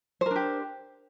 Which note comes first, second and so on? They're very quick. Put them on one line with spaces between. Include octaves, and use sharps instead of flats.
C5 A#4 D4 G4